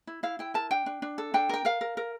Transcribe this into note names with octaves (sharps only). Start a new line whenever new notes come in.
E4
E4 F5
E4 G5
A#4 A5
D4 G5
D4
D4
A4
D4 G5
A#4 G5
A#4 F5
A#4
A#4